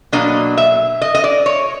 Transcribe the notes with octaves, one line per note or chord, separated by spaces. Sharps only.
B2 F#3 A#3 D4 D#5
E5
D#5
D#5
D5
C#5